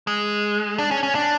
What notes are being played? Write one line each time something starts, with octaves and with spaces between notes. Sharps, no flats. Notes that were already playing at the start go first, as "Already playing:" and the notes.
G#3
D4
C#4
C#4
D4